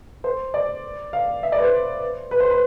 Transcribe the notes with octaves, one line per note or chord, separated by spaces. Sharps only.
C5
D5
F5
E5
D5
B4
C5
B4
C5
B4